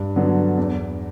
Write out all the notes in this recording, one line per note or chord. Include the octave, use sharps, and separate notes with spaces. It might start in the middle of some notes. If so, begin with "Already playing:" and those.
Already playing: G2
D3 F#3 B3
E2